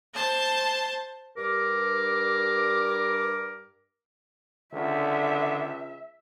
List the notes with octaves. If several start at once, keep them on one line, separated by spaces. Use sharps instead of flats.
C5 A5
G2 A#4 D6
C#2 D3 E5